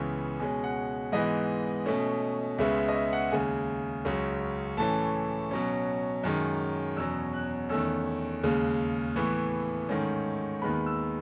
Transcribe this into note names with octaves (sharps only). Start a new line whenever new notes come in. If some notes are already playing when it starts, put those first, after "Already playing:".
Already playing: C#2 C#3 E3 B3
B2 G#3 C#4 G#5
F#5
G#2 E3 G#3 B3 D#5
B2 A3 C#4
C#2 C#3 G#3 B3 E5
E5
D#5
E5
F#5
D#2 C#3 G#3 G#5
C#2 C#3 F#3
A2 E3 A3 C#4 A5
B2 F#3 C#4
F#2 D#3 G#3 C#4
E2 B2 F#3 C#4 E6
F#6
E2 D#3 A3 C#4 E6
D#2 C#3 G#3
A2 E3 B3 C#6
G#2 D#3 A3 C#4
D#2 D#3 G#3 B3 B5
E6